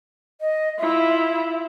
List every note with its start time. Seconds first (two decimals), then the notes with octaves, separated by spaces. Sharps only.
0.41 D#5
0.79 E4 F4 E5